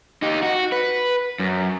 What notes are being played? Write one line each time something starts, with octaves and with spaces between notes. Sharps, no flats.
D#4 G4
F#4
B4
F#2